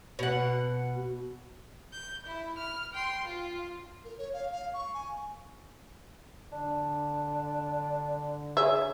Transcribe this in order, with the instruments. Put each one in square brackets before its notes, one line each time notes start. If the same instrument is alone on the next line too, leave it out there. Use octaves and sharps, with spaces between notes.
[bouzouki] B2 F#5
[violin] G6
E4
F6
G5 C6
F4
[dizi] A#4
C#5
F5
F5
C#6
G#5
[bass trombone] D3 [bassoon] D4
[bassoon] C#3 [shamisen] G#4 E5